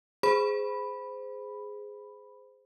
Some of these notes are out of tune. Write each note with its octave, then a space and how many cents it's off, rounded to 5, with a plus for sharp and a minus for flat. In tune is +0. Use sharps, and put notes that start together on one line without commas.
G#4 +0 C5 -20 B5 +0